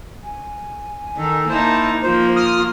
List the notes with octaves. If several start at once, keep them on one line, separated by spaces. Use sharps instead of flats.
G#5
D#3 A4
A#3 D#4 E4 C5 A5
F3 A#3 F4 C5
D#6 F6